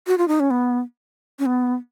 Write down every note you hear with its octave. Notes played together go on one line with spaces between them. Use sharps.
F#4
F4
D#4
C#4
B3
C#4
B3